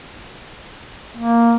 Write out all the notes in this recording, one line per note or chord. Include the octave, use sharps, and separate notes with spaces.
A#3